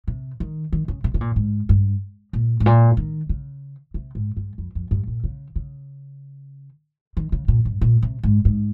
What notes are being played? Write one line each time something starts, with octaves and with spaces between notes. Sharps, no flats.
C3
D#3
D#3
C#3
C3
C3
A#2
G#2
G2
A#2
G#2
A#2
D#3
C#3
C3
G#2
G2
F2
F2
G2
A#2
C#3
C#3
D#3
C#3
A#2
G2
A#2
C3
G#2
G#2